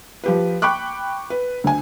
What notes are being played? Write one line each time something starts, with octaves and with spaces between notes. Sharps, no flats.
F3 G4 B4
G5 B5 C#6 D6 F#6
B4
D2 G#5